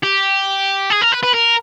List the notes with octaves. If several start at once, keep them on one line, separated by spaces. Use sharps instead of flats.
G4
G#4
A#4
B4
B4
A#4